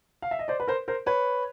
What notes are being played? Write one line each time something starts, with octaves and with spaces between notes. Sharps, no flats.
F5
E5
D#5
C5 D5
B4
A#4 C5
A#4 C5
B4 C#5